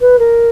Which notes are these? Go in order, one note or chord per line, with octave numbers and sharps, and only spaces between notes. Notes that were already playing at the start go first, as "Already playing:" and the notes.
B4
A#4